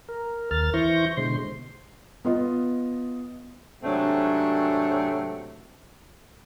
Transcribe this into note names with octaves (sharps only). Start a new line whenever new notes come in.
A#4
D#2 A#4 F6 A6
E3 E4 C5 C#6 G6 A#6
B2 D3 G#3 C5 C6
B3 F4 D#5
G#2 C3 F#3 A3 C4 D4